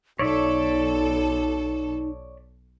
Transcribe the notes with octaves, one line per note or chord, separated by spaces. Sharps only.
B1 D#4 A4 C#5 D5 E5